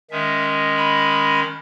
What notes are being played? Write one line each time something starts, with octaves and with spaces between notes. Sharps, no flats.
D#3 G#3 C#4 E5
B5